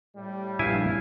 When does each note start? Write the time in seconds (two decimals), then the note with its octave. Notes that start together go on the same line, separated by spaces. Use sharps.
0.16 A2 G3
0.59 A#1 G2 E4 F5 G#5